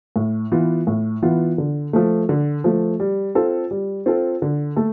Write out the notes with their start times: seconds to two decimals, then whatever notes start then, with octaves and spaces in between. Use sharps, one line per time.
0.16 A2
0.52 E3 B3 F4
0.87 A2
1.22 E3 B3 F4
1.58 D3
1.93 F3 A3
2.29 D3
2.64 F3 A3
3.00 G3
3.35 C4 F4 A4
3.71 G3
4.06 C4 F4 A4
4.42 D3
4.76 A3 A4